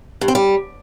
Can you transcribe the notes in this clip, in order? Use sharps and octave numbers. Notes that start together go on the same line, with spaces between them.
G2
C4
G3